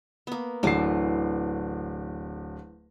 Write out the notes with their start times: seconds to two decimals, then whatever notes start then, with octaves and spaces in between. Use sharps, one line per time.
0.27 A#3 B3
0.63 D1 D3 E3 A5 D6 C7